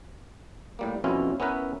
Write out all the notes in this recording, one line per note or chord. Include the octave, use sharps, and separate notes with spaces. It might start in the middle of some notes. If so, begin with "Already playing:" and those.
A2 G3 A#3
F2 B2 G3 C#4 E4 F4
B3 C#4 E4 A#4 B4